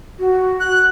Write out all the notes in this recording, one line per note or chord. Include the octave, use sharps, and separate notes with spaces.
F#4
F#6